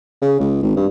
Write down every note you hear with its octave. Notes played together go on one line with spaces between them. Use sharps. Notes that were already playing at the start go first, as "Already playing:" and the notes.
C#3
C#2
G#1
G2